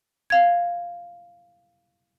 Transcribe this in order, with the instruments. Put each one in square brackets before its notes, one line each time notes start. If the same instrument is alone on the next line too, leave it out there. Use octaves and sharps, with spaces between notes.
[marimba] F5 G#6